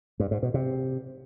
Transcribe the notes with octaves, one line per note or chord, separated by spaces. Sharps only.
G2
G#2
B2
C3